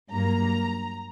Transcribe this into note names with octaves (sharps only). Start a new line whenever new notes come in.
G2 F#3 A#3 A#5